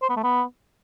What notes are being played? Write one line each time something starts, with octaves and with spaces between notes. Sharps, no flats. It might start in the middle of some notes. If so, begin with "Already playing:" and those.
C5
B3
A3
B3